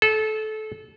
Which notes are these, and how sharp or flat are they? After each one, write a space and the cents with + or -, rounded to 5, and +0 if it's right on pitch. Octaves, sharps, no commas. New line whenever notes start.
A4 -25